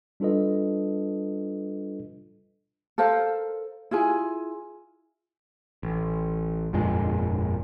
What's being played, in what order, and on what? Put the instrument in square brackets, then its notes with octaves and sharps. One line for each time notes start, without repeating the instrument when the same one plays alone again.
[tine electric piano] G3 D4 F4 A4 B4 D#5
[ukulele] A4 A#4 C5 F5
E4 F4 G#4 G#5
[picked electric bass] A1
G1 F2 A#2 G#3